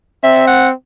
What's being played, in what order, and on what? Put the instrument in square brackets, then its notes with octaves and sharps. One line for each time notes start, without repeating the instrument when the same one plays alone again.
[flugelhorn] C4 [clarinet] E5
[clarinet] F#5